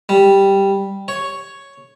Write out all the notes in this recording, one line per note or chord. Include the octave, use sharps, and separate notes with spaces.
G3
C#5